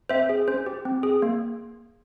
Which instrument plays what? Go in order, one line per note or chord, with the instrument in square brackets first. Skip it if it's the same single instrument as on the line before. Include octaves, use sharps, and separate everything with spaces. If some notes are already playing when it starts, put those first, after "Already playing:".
[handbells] C4 C5 E5
G#4
C#4 C5
G4
C4
G#4
A#3